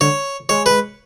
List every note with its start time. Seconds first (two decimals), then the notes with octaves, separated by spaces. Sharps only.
0.01 D3 C#5
0.49 G#3 C#5
0.66 B4